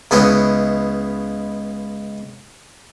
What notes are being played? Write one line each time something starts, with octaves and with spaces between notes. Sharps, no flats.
C#2 B3 C#4 E4 D#5